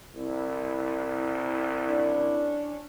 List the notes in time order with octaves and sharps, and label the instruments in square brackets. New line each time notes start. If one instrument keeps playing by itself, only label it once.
[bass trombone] C2 [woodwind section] E4
[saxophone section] C#4 D4